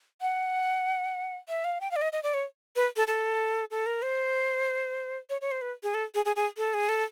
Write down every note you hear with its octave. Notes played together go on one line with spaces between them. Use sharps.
F#5
E5
F5
G5
F5
D5
D#5
D#5
D5
C#5
B4
A4
A4
A4
A#4
C5
C#5
C#5
C5
B4
G#4
A4
G#4
G#4
G#4
A4
G#4
A4